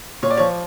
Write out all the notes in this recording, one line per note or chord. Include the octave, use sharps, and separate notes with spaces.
A#2 C#5
D5
F3 C#5